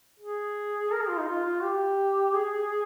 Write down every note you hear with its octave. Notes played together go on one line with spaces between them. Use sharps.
G#4
A#4
G#4
F4
D#4
F4
F4
G4
G#4